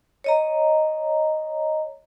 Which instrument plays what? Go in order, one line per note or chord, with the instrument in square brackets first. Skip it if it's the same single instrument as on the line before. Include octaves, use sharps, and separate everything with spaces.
[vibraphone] C#5 D#5 A#5